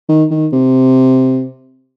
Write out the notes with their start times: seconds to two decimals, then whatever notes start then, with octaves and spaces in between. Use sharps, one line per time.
0.09 D#3
0.31 D#3
0.53 C3